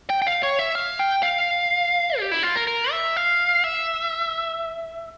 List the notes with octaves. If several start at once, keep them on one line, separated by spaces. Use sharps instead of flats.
G5
G5
F5
C#5
E5
F5
G5
F5
G4
E4
F4
A#4
A#4
E5
F5
E5